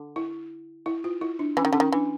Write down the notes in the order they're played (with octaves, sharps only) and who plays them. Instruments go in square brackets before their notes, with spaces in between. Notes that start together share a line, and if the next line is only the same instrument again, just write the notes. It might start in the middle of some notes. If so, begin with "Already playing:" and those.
Already playing: [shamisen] D3
[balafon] E4
E4
F4
E4
D4
[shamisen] E3 [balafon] C#4
[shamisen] D#3
[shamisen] D3 [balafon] C#4
[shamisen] D#3
[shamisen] E3 [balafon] D4